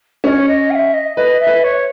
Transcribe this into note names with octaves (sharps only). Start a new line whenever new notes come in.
C#4 C#5 D#5
D#5
G#5
E5
D#5
B4 D#5
E5
B4
C#5